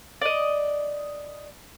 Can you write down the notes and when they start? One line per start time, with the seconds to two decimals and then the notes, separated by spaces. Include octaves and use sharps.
0.21 D5 D#5